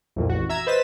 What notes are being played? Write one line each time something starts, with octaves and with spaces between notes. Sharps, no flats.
C2 F2 A#2
A1 F#4
E5 A#5 E6 G#6
B4 C5 D#5 A6 B6 E7